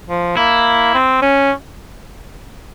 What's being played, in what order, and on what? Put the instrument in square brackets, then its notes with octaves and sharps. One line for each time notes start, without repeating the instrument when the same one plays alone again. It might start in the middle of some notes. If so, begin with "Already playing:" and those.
[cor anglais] F3
[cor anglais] A#3 [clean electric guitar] E4
[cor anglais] C4
C#4